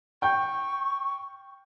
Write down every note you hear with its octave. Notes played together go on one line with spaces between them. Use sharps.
G5 C#6 G6